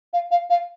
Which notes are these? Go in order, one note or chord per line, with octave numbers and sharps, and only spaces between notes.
F5
F5
F5